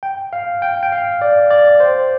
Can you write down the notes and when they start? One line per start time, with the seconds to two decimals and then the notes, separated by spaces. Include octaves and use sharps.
0.03 G5
0.33 F5
0.62 G5
0.83 G5
0.92 F5
1.22 D5
1.51 D5
1.80 C5